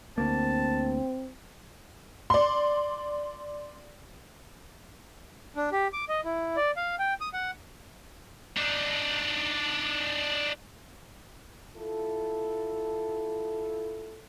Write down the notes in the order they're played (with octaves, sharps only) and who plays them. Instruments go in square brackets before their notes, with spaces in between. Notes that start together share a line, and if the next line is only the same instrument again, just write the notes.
[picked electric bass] D2 A#3 [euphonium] C4 [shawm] A5
[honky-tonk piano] D5 C6
[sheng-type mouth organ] D4
G4
D6
D#5
E4
D5
F5
G5
D#6
F#5
[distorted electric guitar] D4 D#4
[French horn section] E4 F4 A4